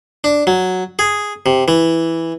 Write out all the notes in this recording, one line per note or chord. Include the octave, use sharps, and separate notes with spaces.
D4
F#3
G#4
C3
E3